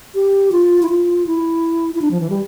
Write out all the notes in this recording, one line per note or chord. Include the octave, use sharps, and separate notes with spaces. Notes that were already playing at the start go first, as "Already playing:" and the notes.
G4
F4
E4
F4
E4
E4
D4
F3
E3
G3